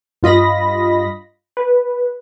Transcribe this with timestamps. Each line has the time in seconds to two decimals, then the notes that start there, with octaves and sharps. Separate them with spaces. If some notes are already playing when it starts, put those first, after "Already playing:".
0.23 G2 F4 D#5 B5 A#6
1.57 B4